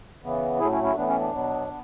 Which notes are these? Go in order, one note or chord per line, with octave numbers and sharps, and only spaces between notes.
C#3 E3 B3
A2 F#3 A3 E4 G#4
C#4 E4
C#4 E4
A2 E3 B3 D4
C#4
D4
B2 F#3 B3
B3